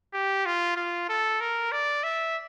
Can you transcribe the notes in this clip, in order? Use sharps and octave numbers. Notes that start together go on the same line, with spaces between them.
G4
F4
F4
A4
A#4
D5
E5